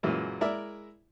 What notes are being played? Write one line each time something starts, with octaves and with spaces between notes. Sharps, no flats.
F#2 A#2 E3 G#3
G#3 E4 A#4 D5 E5